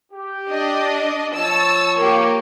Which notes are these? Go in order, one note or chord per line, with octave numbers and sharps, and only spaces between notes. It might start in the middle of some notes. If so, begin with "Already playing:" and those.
G4
D4 D#5
F3 C#5 A5 E6
A#3 G4